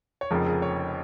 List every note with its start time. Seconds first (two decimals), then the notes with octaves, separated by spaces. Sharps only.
0.21 C#5
0.30 F1 F2 C#3 F3 G#3 A#4
0.46 G#4
0.62 C#5